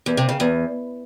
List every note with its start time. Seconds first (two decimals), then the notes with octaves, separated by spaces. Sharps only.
0.06 E2
0.17 C3
0.29 C#3
0.40 E2